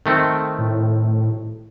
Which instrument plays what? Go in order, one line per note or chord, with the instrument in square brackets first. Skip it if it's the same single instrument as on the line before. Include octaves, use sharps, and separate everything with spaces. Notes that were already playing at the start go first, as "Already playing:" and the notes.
[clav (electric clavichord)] D#3 A3 C4
[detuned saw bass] A2